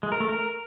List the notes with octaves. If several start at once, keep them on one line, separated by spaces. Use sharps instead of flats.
G#3
A#4
A3
A#4